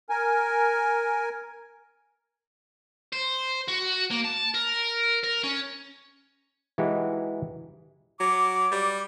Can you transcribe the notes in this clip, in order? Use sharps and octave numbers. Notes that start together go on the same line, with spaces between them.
A#4 G#5
C5
F#4
A#3
A5
A#4
A#4
C#4
E3 G#3 D#4 E4 F#4 G4
F#3 D6
G3